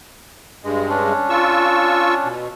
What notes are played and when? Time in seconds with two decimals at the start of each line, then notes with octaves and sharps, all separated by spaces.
0.64 G2 G#3
0.89 C#4 D4
1.30 F4 C#6 E6
2.25 B2